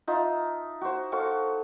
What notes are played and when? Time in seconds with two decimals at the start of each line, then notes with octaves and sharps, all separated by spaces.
0.07 D#4 F4 E5 A5
0.81 F#4 C5
1.12 F#4 A4 C5 F5